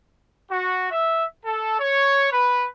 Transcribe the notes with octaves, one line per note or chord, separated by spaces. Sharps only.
F#4
E5
A4
C#5
B4